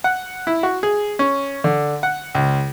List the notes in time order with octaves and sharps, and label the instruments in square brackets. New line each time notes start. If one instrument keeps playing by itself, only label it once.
[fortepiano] F#5
E4
F#4
G#4
C#4
D3
F#5
C#2